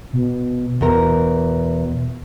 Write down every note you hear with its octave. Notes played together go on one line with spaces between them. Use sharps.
B2
E2 B2 A#4